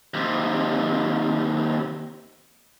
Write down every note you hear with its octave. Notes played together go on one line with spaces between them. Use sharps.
D#2 C3